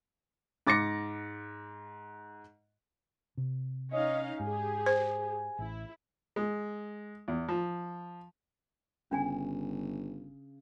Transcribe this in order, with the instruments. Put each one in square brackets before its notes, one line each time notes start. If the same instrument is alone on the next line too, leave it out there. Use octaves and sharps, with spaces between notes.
[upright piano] G#2 D6 A6 A#6 C#7
[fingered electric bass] C3
[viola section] C#4 D#4 F5 [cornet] D#5
[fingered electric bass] G#2 [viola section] G4 G#4 [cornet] G#5
[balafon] C5
[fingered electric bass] A1 [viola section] E4
[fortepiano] G#3
E2
F3
[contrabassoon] G1 [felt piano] C#3 [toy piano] C#4 D4 G#5